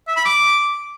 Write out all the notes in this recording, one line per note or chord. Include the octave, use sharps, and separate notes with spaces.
E5
B5
D6